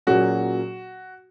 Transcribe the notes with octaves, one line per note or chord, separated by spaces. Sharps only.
A#2 F#3 A#3 C#4 F#4 G#4